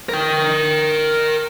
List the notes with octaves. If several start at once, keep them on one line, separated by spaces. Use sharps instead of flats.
A#4 G5